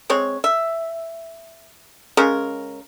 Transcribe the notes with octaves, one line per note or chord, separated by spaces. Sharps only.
G#3 C4 C#5
E5
C#3 G#3 C#4 A#4